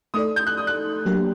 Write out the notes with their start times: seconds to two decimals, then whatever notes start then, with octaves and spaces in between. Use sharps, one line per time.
0.14 A3 D#4 A4 D5 D#6
0.36 G6
0.47 F#6
0.57 D#6
0.67 F#6
1.06 F#3 A#3 D4 G4 A#4